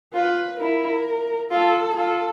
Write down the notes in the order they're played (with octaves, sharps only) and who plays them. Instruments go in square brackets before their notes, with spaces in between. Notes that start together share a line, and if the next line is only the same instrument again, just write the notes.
[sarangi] F4 [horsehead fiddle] B4
[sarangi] E4 [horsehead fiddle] A#4
[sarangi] F4 [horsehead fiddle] A4
[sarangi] F4 [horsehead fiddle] A4